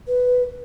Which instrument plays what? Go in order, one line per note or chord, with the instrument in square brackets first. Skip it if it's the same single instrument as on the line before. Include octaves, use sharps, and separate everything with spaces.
[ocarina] B4